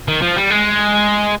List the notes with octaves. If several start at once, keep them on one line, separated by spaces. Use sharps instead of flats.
D#3
F3
G3
G#3